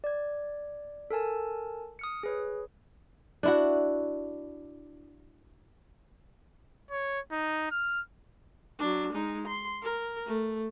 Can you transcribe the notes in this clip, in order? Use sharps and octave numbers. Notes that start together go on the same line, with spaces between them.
D5 G#6
A4 A#4 G#5 A5
D#6 F6 C#7
G#4 B4 C#5
D4 E4 F#4
C#5
D#4
F6
F#3 D4
G#3 D#4
C6
A#4
A3